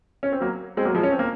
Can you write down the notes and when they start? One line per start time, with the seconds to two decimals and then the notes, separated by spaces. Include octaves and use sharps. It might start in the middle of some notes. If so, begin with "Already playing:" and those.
0.23 C#4
0.32 C4
0.40 F#3 A#3
0.77 G#3 C4
0.85 F#3 A#3
0.95 F3 G#3
1.03 C#4
1.12 C4
1.19 A#3